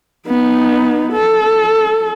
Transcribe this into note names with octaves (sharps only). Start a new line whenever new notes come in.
B3 D#4
A4